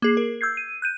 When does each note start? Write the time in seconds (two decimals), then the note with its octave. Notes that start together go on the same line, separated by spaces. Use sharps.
0.02 A#3 G#4 C7
0.17 A#4
0.41 E6 G6 G#6 C7
0.57 D#7
0.82 F#6 G6 D#7